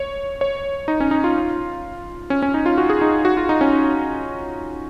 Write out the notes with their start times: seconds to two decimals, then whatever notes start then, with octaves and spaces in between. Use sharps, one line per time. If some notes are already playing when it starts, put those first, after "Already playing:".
Already playing: C#5
0.41 C#5
0.88 D#4
1.00 C#4
1.11 D#4
1.24 F4
2.30 C#4
2.42 C#4
2.54 D#4
2.66 F4
2.78 F#4
2.90 G#4
3.01 D#4
3.25 F#4
3.37 F4
3.49 D#4
3.61 C#4